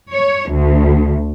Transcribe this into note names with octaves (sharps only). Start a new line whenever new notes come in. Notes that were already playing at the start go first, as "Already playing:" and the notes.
C#5
D2